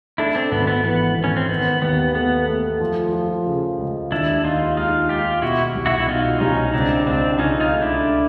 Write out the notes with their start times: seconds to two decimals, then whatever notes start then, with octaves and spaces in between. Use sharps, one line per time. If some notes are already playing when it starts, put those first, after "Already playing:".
0.18 A3 D4 E4
0.35 C4 D4
0.52 G#1 B3
0.67 B3
0.84 E3 B3
1.17 G#1
1.24 C#4
1.37 C4
1.49 D#3 B3
1.82 D#2 B3
2.15 A3 B3
2.48 A3
2.80 F3
3.13 F3
3.46 C#3
3.79 C#2
4.12 D#2 D4 E4
4.44 D#2 D#4 F4
4.77 G#3 D#4 F4
5.09 G#3 F4 G4
5.42 B2 E4 F#4
5.75 C2
5.86 E4 F#4
5.98 E4
6.08 B2 D#4 F4
6.40 C2 C#4 D#4
6.73 C#2 C4 D4
7.06 C#2 C4 D4
7.39 C#2 C#4 D#4
7.60 D#4 F4
7.72 A3
7.82 D4 E4